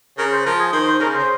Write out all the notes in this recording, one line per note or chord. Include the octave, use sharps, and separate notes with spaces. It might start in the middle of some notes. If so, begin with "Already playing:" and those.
C#3 A#4
C5
F3 A#4
G#4
D#3 C5
C5
C#3 A#4
C#3 C5